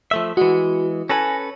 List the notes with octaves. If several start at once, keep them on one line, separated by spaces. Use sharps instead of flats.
F3 A3 E5
E3 G#3 F#4
C#4 A4 B4 G#5 A#6